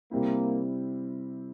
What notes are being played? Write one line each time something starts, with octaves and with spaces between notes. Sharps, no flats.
C3 G3 A#3 C4 E4